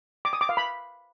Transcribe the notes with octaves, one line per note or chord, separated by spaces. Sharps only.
D6
D#6
D6
F5
B5